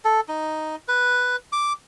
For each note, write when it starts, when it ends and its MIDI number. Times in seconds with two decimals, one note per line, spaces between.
0.05 0.20 69
0.28 0.76 63
0.88 1.36 71
1.52 1.73 86